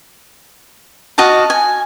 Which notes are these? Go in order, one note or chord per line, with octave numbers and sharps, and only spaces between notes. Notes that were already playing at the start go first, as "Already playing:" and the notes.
F#4 D#5 F5 A5
G#5